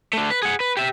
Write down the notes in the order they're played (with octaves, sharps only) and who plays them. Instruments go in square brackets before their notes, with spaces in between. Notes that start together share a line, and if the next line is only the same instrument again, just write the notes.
[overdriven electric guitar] D3 A3
B4
G#4 F#5
B4
G4 E5